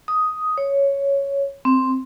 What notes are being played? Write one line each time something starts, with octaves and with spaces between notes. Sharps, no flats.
D#6
C#5
C4